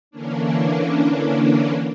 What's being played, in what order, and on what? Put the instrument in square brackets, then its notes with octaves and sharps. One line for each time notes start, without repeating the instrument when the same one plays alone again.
[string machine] D3 E3 A#3 C#4 D4